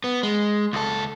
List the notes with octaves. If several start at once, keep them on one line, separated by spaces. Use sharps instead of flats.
B3
G#3
C#2 A4